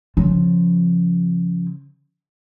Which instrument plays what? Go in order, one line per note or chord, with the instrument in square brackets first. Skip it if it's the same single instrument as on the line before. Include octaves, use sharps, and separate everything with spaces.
[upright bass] C#3 F3